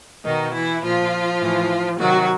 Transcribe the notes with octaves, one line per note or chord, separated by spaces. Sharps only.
B2 D#3 D#4
E3 E4
A#2 F3 F4
A2 E3
C3 D#3 F#3 F#4